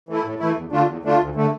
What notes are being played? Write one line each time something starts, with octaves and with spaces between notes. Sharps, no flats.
E3 A3 E4
A2
E3 A3 E4
E2
D3 A3 D4 F4
E2
D3 A3 D4 F4
D2
D3 A3